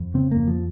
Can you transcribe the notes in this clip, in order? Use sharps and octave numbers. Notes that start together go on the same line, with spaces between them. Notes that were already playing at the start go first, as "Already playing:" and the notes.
Already playing: F2
C#3 C4
F2 A#3
F3